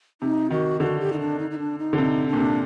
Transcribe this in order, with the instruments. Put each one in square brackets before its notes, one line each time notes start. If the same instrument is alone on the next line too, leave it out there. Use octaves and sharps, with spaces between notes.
[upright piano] C3 [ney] D#4
[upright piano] D#3 [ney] F#4
[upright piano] D3 [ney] F#4
[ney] G4
D#4
D4
D#4
D#4
D4
D#4
[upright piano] D3
[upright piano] C3 [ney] D#4
[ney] D4
[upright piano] A#2
C3